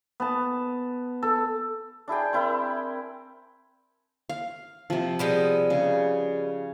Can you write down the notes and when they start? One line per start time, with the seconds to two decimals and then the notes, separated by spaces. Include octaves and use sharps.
0.20 B3 A5
1.23 A4
2.08 D4 E4 G#4 G5
2.33 C4 E4 A#4 B5
4.29 F5
4.90 C3 F3
5.19 G3 G#3 B3
5.70 C#3